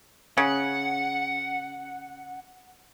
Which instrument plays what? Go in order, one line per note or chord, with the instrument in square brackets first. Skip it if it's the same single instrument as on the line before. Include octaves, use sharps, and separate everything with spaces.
[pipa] C#3 [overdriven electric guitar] F#5